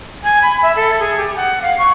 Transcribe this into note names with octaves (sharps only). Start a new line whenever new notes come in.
G#5
B5
E5
A4
G#4
G4
F#5
F5
C#6